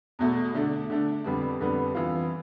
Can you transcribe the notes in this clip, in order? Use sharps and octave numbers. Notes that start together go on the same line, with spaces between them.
E2 B2 A3
D3 A3 D4
D3 A3 D4
F2 D3 G3 B3 D4
F2 D3 G3 B3 D4
F2 E3 B3 F4